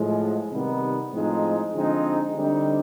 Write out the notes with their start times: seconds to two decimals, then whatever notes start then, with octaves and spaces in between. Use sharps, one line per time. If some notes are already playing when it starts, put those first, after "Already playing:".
Already playing: A2 F3 G#3
0.51 C3 D#3 G3 B3 D#4
1.13 A2 F3 G#3 C4 D#4
1.74 D3 F3 G#3 C4 D#4
2.35 D3 G3 C4 D#4